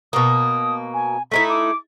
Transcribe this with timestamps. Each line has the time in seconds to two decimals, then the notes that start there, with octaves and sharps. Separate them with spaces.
0.13 B2 A#3 D#6
0.94 G#5
1.31 A3 D#4 E4 B6
1.49 D6